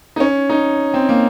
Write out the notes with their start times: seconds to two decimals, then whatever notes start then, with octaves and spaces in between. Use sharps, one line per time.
0.16 D#4
0.20 C#4
0.49 D#4
0.94 C4
1.09 A#3